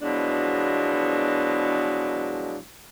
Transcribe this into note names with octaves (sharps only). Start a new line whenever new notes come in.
E2 B2 F3 F#3 G#3 D4